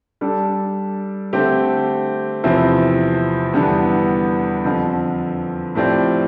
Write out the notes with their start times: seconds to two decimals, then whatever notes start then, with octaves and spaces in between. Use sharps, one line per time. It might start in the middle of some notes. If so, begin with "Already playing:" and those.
0.21 G3 D4 A4
1.33 D3 A3 C4 G4
2.44 E2 C3 F3 C4 E4
3.53 E2 D3 G3 B3 D4
4.64 F2 D3 F3
5.75 A2 F3 C4 G4 D5